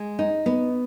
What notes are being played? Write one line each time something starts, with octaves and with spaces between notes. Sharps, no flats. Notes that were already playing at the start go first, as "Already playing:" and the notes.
Already playing: G#3
D#4
B3